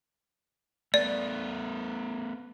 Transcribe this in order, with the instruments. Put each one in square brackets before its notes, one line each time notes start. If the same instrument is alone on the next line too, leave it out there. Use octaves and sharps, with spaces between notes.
[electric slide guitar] A3 B3 [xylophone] D5